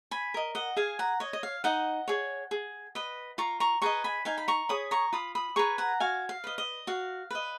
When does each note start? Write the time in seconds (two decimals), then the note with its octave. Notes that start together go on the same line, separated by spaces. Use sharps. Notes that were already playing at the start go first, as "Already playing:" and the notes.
0.11 G#5 B5
0.34 A#4 D#5
0.55 D#5 F#5
0.76 G#4 F5 G#5
0.99 F#5 A#5
1.20 C#5 D#5
1.33 D#5
1.43 F5
1.64 D#4 D#5 F#5
2.08 G#4 C#5
2.51 G#4
2.95 B4 D#5
3.38 F4 A#5 C#6
3.60 A#5 C#6
3.82 G#4 B4 D#5 A#5 C#6
4.04 G#5 B5
4.25 D#4 F5 G#5
4.38 B5
4.48 A#5 C#6
4.69 G#4 C#5 B5 D#6
4.91 A#5 C#6
5.13 F4 B5 D#6
5.35 B5 D#6
5.56 G#4 B4 A#5 C#6
5.78 F#5 A#5
6.00 F#4 F5 G#5
6.29 F5
6.44 B4 D#5
6.58 D#5
6.87 F#4 F5
7.31 B4 D#5